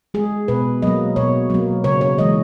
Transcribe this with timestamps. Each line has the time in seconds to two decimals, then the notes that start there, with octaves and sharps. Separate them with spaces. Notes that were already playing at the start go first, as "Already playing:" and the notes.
0.14 G#3 G#4
0.48 B2 B4
0.82 F#3 A#3 D#5
1.16 B2 C#5
1.50 F#3 A#3
1.84 C#3 C#5
2.01 C#5
2.18 E3 G#3 D#5